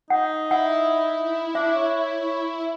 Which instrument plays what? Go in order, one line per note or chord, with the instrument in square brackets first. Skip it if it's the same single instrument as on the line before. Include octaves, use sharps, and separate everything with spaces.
[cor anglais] D#4 [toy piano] F#5
[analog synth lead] E4 [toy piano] F#5
[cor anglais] D4 [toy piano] E5
[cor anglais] C#5